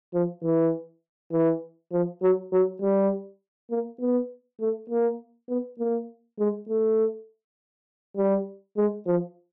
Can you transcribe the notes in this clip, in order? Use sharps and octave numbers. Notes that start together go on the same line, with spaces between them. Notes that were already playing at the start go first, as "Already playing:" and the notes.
F3
E3
E3
F3
F#3
F#3
G3
A#3
B3
A3
A#3
B3
A#3
G#3
A3
G3
G#3
F3